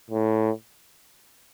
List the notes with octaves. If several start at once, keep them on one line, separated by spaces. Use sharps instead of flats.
A2